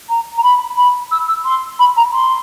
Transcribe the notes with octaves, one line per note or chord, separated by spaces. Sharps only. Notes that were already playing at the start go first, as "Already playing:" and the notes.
A#5
A#5
B5
B5
E6
E6
C6
B5
A#5
C6